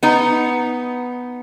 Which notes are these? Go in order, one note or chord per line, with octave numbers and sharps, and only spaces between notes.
B3 D#4